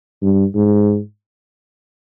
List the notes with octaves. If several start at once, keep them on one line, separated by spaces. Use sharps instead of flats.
G2
G#2